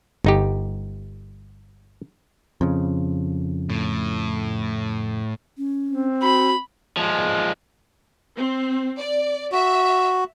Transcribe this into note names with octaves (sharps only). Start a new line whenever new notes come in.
G1 D#4 G4
F2 C#3
A2
C#4
C4
F#4 B5
F3 G#3
C4
D5
F#4 E5